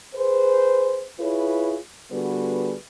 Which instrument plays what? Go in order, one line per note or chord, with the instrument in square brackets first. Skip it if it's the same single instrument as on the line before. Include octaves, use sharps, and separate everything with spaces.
[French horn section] G#4 B4 C5
E4 F4 G#4 B4 C#5
D3 G3 B3 F#4 G#4 B4